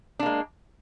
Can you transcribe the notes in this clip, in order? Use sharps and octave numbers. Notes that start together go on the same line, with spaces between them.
G#3 A#3 D4